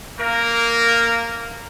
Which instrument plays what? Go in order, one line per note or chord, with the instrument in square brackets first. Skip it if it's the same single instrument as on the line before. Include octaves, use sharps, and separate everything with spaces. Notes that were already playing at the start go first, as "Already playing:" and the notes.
[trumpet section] A#3 A#4